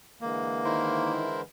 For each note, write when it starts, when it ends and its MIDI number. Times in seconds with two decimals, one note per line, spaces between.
0.21 1.42 50
0.21 1.42 52
0.21 1.42 56
0.21 1.12 58
0.64 1.25 51
0.64 1.41 64
0.64 1.41 70
0.64 1.41 72